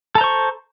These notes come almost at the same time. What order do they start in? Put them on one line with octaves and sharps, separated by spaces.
A4 A#5 C5 C#6